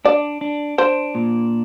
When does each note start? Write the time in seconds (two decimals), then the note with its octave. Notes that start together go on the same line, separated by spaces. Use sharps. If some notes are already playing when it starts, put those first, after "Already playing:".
0.05 D4 D5
0.41 D4
0.78 D4 C5
1.15 A#2